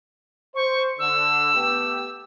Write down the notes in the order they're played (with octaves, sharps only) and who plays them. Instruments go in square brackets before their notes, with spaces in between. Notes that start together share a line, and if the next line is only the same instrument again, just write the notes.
[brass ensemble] C5 [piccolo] C#6
[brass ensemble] D3 [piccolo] E6
[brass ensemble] A3 B3 G4